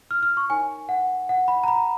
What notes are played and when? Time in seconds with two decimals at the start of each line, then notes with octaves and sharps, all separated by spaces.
0.11 F6
0.23 F6
0.37 C#6
0.49 D#4 A#4 C#5 G#5
0.89 F#5
1.29 F#5
1.48 B5
1.64 A#5
1.68 B5